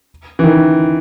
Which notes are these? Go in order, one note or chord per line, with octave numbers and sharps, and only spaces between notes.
E3
D#3